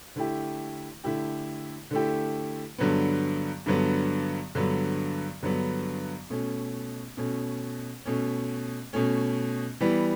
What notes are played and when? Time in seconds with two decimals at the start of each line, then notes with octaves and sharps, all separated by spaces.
0.16 D3 A3 E4 G4
1.04 D3 A3 E4 G4
1.91 D3 A3 E4 G4
2.78 G2 D3 F#3 B3
3.66 G2 D3 F#3 B3
4.55 G2 D3 F#3 B3
5.43 G2 D3 F#3 B3
6.30 B2 A3 C#4
7.17 B2 A3 C#4
8.06 B2 A3 C#4
8.93 B2 A3 C#4
9.80 E3 G3 B3